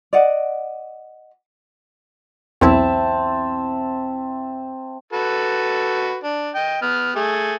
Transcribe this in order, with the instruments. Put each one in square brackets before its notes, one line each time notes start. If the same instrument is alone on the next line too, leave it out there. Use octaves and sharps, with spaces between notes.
[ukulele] D5 D#5 F#5
[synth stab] B1 E2 E4 [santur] C4 E5 A5
[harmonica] F#4 A4 B4
D4
D#5 G5
B3 F6
A3 G#4